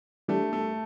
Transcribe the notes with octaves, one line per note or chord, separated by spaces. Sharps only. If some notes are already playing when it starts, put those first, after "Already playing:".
E3 G3 A3 D4 G4
A3